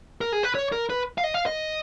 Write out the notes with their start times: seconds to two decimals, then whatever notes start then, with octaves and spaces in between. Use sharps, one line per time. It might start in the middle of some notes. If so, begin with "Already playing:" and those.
0.21 A#4
0.32 G#4
0.43 B4
0.55 C#5
0.72 A#4
0.90 B4
1.18 F5
1.24 D#5
1.34 F5
1.46 D#5